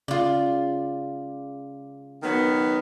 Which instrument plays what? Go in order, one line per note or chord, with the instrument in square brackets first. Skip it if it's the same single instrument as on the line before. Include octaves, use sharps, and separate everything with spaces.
[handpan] C#3 [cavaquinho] F4 D5
[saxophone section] D#3 F#3 B3